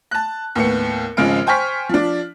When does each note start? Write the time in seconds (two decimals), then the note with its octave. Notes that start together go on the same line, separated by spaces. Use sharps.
0.11 A5 F#6
0.55 D#2 A2 B3 C#7
1.17 G#1 C#3 F3 G#3 F6 D7
1.47 C5 G5 G#5 C#6 F6 B6
1.89 F3 D4